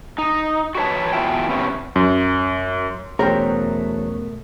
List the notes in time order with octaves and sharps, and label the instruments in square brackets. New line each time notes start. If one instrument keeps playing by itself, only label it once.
[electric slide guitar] D#4
F#4 G4 B4 C#5 A5
B2 E3 F3 F4 E5 G5
C3 B3 C#4
[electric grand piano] F#2
[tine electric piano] E2 F#3 [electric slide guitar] B2 A3 [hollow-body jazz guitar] C#4 C5 G5 [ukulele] A#4